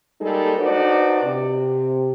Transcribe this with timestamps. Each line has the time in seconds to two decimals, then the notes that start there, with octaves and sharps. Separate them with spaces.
0.21 G3 G#3 A#3 D#4 A4
0.58 D4 D#4 F#4 B4 C5 D5
1.22 C3